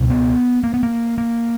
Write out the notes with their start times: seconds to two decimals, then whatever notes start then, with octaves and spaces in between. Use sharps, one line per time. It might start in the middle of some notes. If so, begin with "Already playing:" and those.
Already playing: C#2 B2
0.10 B3
0.64 A#3
0.74 B3
0.83 A#3
1.18 A#3